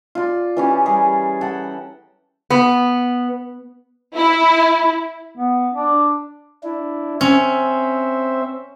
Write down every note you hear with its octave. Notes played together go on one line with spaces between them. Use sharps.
F4 D5
E3 C#4 G4
G3 G#4 A#4
A4 F#5 G5
B3
E4
B3
D4
D4 E4
C4 C#4 C5 E5